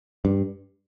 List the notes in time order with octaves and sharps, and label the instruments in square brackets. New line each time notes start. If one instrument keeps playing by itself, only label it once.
[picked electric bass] G2